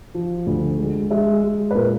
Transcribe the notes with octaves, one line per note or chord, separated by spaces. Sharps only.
F3
D2
G#3
G#3 E5
G#3
B4
A#2 A#4